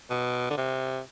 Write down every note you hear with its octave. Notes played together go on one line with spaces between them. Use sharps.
B2
D3
C3